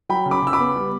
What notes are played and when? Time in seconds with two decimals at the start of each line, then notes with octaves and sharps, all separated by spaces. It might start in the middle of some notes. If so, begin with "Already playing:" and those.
0.09 F#3 G5 B5
0.26 C#3
0.31 B5 D6
0.42 C#3 E6
0.53 B5 D6
0.59 B3
0.76 G3